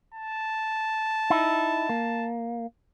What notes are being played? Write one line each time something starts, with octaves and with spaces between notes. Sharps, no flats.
A5
D#4 E4
A#3